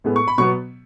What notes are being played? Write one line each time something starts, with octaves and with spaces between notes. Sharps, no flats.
A2 G#3 B3
C#6
B5
B2 F#3 B3 C#6